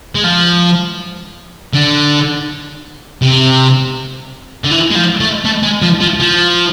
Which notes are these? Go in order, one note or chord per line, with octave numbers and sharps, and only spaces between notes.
G#3
F3
D3
C3
D3
E3
G#3
F3
A3
A3
G#3
F3
F3
F3